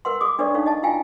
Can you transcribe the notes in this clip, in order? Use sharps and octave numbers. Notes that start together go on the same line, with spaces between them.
A#4 B4 F#5 C6
G#4 D6 D#6
D4 A4 B4 C#5 D5 C#6
C#4 D#4 A4 C#5 F5
D#5 A5
E4 F4 F5 G5 G#5 A#5